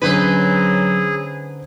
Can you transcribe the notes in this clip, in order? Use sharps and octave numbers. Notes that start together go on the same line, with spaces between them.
D3 F#3 C#4 D#4 G#4 B4 C5